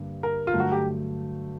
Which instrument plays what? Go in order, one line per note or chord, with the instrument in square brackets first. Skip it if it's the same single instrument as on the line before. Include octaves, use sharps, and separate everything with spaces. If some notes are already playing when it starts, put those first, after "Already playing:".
Already playing: [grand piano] G2 D3 G3 A#3
[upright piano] A#4
F4
[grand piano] G2 D3 F#3 A3
[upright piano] F#4
G4